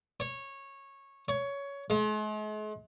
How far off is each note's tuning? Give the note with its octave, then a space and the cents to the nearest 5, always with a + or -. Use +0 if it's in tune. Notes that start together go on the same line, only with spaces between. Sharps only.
C#5 -15
C#5 +15
G#3 +45